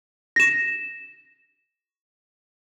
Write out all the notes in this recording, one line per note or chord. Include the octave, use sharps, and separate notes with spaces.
A#6 E7